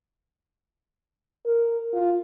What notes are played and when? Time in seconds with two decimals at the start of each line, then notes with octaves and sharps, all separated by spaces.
1.45 A#4
1.93 F4